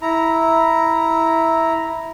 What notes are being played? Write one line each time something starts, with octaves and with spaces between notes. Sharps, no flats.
E4 A#5